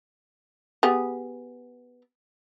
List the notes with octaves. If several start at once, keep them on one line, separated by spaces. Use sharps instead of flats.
B3 G4 G#4